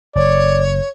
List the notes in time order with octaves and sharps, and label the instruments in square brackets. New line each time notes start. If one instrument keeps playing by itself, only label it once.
[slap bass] F#1 [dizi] C#5 [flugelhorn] D5